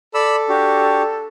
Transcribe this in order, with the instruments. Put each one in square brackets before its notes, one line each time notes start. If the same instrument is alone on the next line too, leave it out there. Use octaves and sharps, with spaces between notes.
[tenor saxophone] A4 [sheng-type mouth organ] D5 B5 E6
[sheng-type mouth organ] D4 F#4 G4